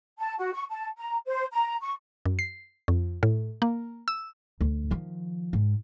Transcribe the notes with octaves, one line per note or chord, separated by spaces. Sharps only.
A5
F#4
C#6
A5
A#5
C5
A#5
C#6
F#2
C7
F2
A2
A#3
E6
D2
D#3 F3
G#2